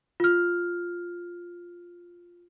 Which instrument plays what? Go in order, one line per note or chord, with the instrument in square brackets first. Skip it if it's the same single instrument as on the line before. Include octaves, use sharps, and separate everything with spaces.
[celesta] F4 F6